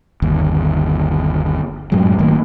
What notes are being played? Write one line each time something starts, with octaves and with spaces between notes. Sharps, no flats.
G1 D#2
F#2 A2 F#3 G#3
G#1 D#3 A3 A#3